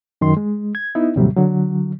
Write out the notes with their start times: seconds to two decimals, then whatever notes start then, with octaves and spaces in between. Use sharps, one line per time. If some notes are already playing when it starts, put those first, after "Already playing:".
0.21 F#2 D#3 C6
0.37 G#3
0.75 G#6
0.95 B3 D#4 E4
1.16 D#2 A2 C3 F#3 G3
1.36 D3 F#3